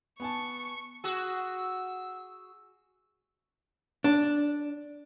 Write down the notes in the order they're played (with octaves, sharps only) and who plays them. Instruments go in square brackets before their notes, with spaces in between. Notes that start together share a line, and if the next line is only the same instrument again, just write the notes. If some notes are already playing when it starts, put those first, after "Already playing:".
[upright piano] B3 G#5 A5 [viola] C#6
[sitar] F#4 G#4 [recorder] E6
[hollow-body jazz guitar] D4